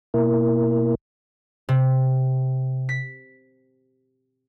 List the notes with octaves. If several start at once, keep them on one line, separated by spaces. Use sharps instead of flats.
B2 A#3 E4 A#4
C3
B6